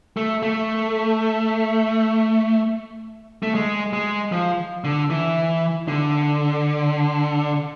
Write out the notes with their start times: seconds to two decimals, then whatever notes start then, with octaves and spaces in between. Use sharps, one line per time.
0.17 A3
0.43 A3
3.43 A3
3.55 G#3
3.93 G#3
4.32 F3
4.84 D3
5.10 E3
5.88 D3